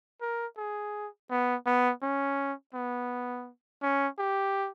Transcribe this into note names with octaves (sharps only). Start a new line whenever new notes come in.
A#4
G#4
B3
B3
C#4
B3
C#4
G4